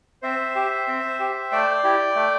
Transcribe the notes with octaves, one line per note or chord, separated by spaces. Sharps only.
C4 C5 E5
G4
C4
G4
A3 D5 G5
E4 G4
A3